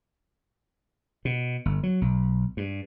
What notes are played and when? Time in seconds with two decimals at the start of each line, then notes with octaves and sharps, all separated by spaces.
1.25 B2
1.65 G1
1.83 F#3
2.02 B1
2.57 G2